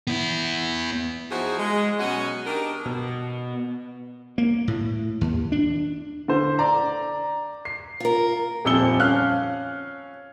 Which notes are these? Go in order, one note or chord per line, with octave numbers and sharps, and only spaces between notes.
B3 E4
F3 D#4 E4 F#4 G#4 C5
G#3
B2 F#3 C#4 F#4 D#5
D4 D#4 G4 A#4
B2
A#3
A2
D#2
D4
D3 C5
D5 A#5
C7
F4 A#4
D#1 F2 F3 E6 C#7 G7
C#4 F5 F6 F#6